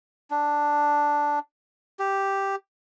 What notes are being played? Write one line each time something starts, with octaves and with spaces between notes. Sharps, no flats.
D4
G4